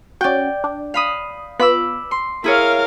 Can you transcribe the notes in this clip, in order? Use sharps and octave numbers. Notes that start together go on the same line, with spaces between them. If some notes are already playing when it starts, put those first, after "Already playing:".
C#4 F#4 D5 G5
D4
F5 B5 D#6
B3 F4 B5 D6 E6
C6
E4 G#4 A#4 C#5 F5